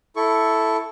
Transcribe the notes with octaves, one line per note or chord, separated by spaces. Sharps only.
E4 A4 C#6